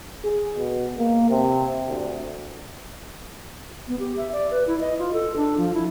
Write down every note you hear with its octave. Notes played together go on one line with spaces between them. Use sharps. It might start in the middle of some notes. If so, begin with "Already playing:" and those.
G#4
B2
A#3
C3
D2
B3
G4
E5
D5
B4
E4
D#5
F4
A4
D4
F3
E4